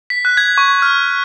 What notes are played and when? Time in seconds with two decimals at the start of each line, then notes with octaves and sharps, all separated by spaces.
0.10 B6
0.25 F#6
0.37 G#6
0.58 C#6
0.82 F6